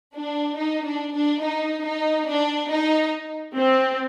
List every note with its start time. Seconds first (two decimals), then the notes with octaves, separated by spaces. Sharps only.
0.16 D4
0.58 D#4
0.86 D4
1.15 D4
1.43 D#4
1.86 D#4
2.28 D4
2.71 D#4
3.56 C4